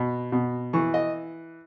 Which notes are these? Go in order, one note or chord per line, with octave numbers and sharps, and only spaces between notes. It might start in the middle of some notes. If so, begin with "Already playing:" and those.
Already playing: B2
B2
E3 C#6
D#5